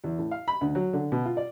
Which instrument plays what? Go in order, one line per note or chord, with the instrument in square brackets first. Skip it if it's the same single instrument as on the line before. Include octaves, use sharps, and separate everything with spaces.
[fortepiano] E2
A2
F5
B5
D2
F#3
D3
B2
F4
D5